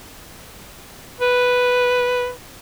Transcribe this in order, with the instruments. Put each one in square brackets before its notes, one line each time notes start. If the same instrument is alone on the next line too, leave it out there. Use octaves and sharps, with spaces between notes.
[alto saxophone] B4